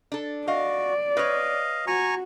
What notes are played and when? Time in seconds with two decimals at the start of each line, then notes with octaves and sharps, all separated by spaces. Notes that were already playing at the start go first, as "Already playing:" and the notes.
0.12 D4 A4
0.48 F#4 D5 D#5 F5
1.17 B4 C#5 D#5 F5
1.87 F#4 G#5 A#5 C#6